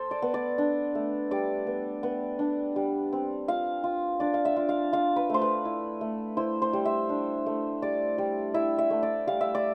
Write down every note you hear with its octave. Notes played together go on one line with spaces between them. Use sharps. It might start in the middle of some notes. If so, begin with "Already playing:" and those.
Already playing: A4 C5
D5
B3
D5
D4
A3
G3 D5
B3
B3
D4
G3
C4
F4 F5
F4
D4 D5
F5
E5
F4
F5
F4 F5
B4
A3 C5
B4
E4
A3
E4 C5
C5
G3
E5
D4
A3
G3 D5
G3
E4 E5
E5
A3
D5
G3 F5
E5
D5